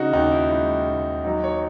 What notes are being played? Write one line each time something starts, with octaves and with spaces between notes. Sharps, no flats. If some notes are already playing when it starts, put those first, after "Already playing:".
Already playing: C#3 D#4 F#4
D#2 D#4
E4
G#3 E4
D#2
F#3 D#4
C#5